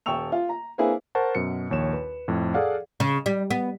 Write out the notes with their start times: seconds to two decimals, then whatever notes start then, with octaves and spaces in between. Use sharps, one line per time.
0.06 D#1 G5 C#6 E6 F7
0.32 F4
0.49 A#5
0.78 A#3 C4 D4 E4 G#4 B4
1.15 A#4 C5 F#5 A5 C#6
1.35 F#2 B2 C#7
1.70 A#1 D#2 C#5 E7
1.93 B4
2.28 F2 A2
2.54 G#4 A4 D5 F5 F#5
3.00 C#3
3.26 G3
3.50 B3